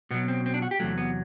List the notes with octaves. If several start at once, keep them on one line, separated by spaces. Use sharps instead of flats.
B2 F#3 B3
C4
C4
D4
F#4
G4
E2 C3 F#3 A3
B3